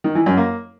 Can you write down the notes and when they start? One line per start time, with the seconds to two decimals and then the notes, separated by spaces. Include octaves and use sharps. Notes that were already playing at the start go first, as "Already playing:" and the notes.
0.04 D#3
0.15 E3
0.26 F#2
0.37 A#3